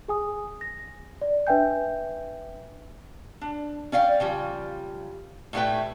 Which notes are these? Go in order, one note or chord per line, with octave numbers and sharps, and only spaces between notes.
G#4 G#5 D#6
A#6
D5
D4 B4 E5 G5 G#5 G6
D4
C#4 D5 F5 G5
C#3 F3 G3
A2 G3 A3 E4 B4 G5